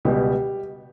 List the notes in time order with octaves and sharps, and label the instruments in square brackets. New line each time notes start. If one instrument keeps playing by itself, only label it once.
[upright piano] C#2 B2 G3 G4